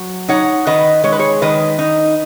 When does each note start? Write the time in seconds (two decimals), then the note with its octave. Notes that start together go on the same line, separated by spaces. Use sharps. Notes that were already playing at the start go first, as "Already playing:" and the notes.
Already playing: F#3
0.29 D#4 C#5 F#5
0.67 D#3 B4 D#5
1.03 G#3 C#5
1.12 B4
1.19 G#4 C#5
1.42 D#3 B4 D#5
1.79 D#4